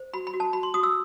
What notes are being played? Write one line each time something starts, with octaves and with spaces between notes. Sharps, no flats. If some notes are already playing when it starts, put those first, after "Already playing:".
Already playing: C5
F#4 B5
B5
F#4
A5
F#4 B5
C6
F#4 D#6
E6